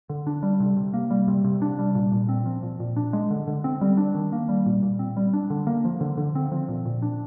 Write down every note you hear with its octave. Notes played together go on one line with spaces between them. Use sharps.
D3
D4
G3
C3
C3
A#3
G3
C3
C3
D4
G3
A#2
A#2
C4
F3
A#2
A#2
D4
G#3
D3
D3
C4
G3
D4
D#3
A#3
G3
A#2
A#2
C4
G3
D4
D3
A#3
F3
D3
D3
C4
F3
A#2
A#2
D4